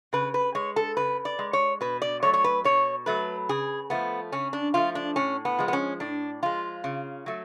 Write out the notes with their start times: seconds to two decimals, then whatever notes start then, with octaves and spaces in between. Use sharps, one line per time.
0.13 C#3 B4
0.34 B4
0.55 G#3 C#5
0.76 A4
0.97 C#3 B4
1.25 D5
1.39 G#3
1.53 C#5
1.81 B2 B4
2.02 D5
2.22 F#3 A3 C#5
2.34 C#5
2.44 B4
2.64 B2 C#5
3.06 F#3 A3 B4
3.49 C#3 G#4
3.90 F3 A3 B3
4.32 C#3 C#4
4.53 D4
4.74 F3 A3 F4
4.95 D4
5.16 A2 C#4
5.45 B3
5.59 F3 G#3
5.68 B3
5.73 C#4
6.00 A2 D4
6.43 F3 G#3 F4
6.84 C#3
7.26 F#3 A3